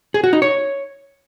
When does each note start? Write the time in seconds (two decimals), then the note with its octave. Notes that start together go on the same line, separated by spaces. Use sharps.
0.14 G#4
0.24 F#4
0.33 D#4
0.42 C#5